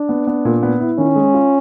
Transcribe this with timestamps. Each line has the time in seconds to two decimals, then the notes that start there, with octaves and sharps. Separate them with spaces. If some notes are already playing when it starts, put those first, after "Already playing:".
Already playing: D4
0.09 B3
0.27 B3
0.45 A#2
0.63 B3
0.80 E4
0.98 D#3 C#4
1.16 G#3
1.34 F4